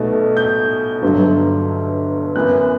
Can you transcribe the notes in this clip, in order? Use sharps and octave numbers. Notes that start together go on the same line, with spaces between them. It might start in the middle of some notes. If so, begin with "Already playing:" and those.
Already playing: B1 B2 A3
G6
G1 G2 D3 F#3
F#2 E3 B3 F#6